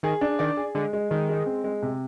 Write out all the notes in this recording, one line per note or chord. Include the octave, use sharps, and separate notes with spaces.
D#3 G#4
D4
D#3 D5
G#4
D3 G#3
G#3
D#3 G#3
G#3
C4
G#3
C3